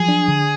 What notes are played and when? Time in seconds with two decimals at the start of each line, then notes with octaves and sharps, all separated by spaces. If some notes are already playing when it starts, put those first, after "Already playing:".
Already playing: F3 F#3 G#4
0.08 D4
0.28 D3